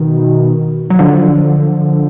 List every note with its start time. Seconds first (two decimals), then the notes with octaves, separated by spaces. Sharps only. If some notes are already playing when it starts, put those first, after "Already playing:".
Already playing: B2 D#3
0.90 F#3
0.99 D3 F3